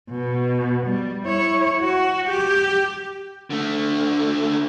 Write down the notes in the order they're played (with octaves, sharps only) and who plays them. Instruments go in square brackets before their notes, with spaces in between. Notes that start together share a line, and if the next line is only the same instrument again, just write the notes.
[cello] B2
G3
E4 C#5
F#4
G4
[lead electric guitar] D3 A3